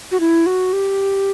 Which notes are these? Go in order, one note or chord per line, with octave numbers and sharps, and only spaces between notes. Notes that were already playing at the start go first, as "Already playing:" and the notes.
F#4
E4
F#4
G4